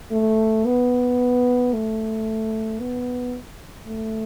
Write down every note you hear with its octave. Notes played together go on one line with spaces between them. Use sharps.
A3
B3
A3
B3
A3